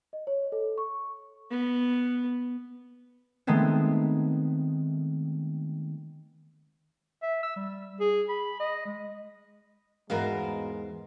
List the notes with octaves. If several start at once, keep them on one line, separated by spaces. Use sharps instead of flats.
D#5
C#5
A4
C#6
B3
D#3 G#3 A3 B3 C4
E5
E6
G3
G#4
B5
D#5
G#3
E2 G#2 G#3 B3 F#4 A#4 F5